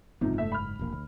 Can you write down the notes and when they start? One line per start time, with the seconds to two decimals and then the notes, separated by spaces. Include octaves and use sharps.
0.21 F#1 G#2 C3 F3 D#4
0.38 A3 E5
0.52 B5 F6
0.79 E1 A#1 A#3
0.92 D2